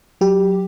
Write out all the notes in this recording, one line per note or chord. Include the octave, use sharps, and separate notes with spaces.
F#3 G4